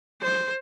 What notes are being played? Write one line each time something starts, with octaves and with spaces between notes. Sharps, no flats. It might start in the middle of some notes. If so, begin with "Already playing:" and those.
C5